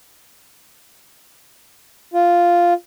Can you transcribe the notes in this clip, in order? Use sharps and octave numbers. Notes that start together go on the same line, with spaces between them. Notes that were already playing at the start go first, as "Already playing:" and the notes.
F4